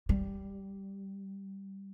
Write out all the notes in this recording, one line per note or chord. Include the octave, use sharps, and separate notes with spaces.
G3